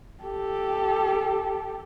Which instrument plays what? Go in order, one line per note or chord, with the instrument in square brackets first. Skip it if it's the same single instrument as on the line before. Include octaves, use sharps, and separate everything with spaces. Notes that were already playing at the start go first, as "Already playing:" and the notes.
[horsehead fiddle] G4 A4